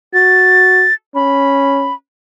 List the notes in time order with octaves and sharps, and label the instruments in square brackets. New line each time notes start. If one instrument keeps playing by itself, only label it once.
[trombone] F#4 [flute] A6
[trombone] C#4 [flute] B5